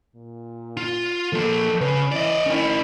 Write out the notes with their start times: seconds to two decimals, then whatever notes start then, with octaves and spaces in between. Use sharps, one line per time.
0.15 A#2
0.77 F4
1.33 F3 A#3 A4
1.81 C#3 B4
2.12 E3 D5 D#5
2.46 D#3 C#4 E4